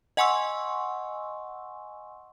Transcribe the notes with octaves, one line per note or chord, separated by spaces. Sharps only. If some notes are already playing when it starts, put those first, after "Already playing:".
D#5 F#5 G#5 C6 C#6 E6